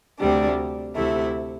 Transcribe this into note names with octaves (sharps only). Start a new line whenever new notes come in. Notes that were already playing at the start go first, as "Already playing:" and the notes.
D2 C3 G3 D4
D2 C3 A3 E4